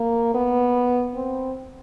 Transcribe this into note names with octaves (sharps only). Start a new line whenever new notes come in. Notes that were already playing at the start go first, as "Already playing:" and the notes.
Already playing: A#3
B3
C4